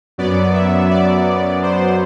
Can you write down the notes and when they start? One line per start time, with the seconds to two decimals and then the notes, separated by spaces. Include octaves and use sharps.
0.18 F#2 F#3 B3 D5
0.54 E5
0.90 D5
1.63 C5